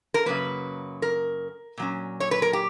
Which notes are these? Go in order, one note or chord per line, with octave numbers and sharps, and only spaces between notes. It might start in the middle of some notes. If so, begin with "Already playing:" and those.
A#4
F#2 C#3 F#3 A#3 B4
A#4
A#2 F#3 C#4
C#5
B4
A#4
G4